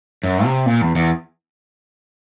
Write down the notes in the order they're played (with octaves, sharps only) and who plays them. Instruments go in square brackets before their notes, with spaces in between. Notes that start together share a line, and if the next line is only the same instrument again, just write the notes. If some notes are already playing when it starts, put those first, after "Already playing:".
[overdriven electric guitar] F#2
C3
A#2
E2
E2